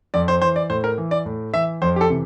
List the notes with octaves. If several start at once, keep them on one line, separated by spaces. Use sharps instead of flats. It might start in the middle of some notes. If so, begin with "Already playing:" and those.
F2 D5
C5
E3 C5
D5
A2 C5
A#4
E3
D5
A2
E3 E5
F2 C5
G4
A4
C3 E3